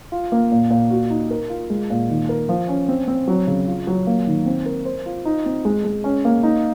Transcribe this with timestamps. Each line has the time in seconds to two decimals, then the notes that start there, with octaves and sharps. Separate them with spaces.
0.12 F4
0.32 A#3
0.51 A#2
0.70 A#2
0.91 F#4
1.10 D#4
1.30 A#4
1.50 F4
1.70 G#3
1.90 A#2
2.10 D#3
2.29 A#4
2.49 F3
2.68 C#4
2.88 C4
3.08 C4
3.28 F#3
3.47 C#3
3.68 F4
3.87 F#3
4.07 A#3
4.27 D#3
4.46 C4
4.66 A#4
4.85 C5
5.06 F4
5.25 D#4
5.46 C4
5.65 G#3
5.84 G#3
6.04 C#4
6.25 A#3
6.43 D#4